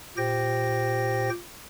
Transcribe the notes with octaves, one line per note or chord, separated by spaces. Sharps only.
A#2 G4 C5 G5 A#6